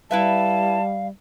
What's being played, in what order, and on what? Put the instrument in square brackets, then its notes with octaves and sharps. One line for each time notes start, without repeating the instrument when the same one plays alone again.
[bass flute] G3 [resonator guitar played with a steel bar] E4 B4 E5 [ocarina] F5 [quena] A5